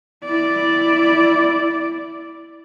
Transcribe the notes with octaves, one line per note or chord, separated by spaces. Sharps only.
E4 D5